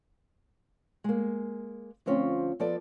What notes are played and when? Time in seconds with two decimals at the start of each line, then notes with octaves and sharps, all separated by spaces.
1.04 G#3 A#3
2.06 D2 F3 C4 C#4 F4
2.60 F3 B3 A4 D5